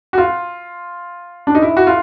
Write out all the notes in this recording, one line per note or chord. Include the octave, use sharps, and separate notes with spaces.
F#4
F4
D4
D#4
E4
F#4
F4